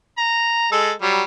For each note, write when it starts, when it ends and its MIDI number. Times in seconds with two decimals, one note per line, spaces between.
0.18 0.70 82
0.72 0.92 56
0.72 0.92 69
1.02 1.23 54
1.02 1.23 55